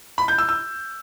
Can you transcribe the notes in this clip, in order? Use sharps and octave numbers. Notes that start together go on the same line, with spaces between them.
B5
G6
E6
E6